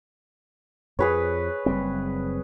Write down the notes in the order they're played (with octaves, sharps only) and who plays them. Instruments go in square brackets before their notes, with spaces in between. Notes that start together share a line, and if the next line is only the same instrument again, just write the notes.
[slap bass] F2 [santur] G#4 B4 C#5
[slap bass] F#1 G3 C4